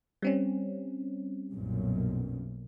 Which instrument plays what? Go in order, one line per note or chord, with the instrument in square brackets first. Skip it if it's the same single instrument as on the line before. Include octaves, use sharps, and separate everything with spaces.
[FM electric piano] G3 C4 C#4
[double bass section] B1 F#2 A#2